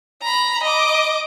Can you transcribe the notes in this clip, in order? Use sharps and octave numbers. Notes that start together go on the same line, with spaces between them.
A#5 B5
D#5 D6